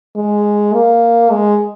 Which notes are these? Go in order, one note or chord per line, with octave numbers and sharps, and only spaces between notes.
G#3
A#3
G#3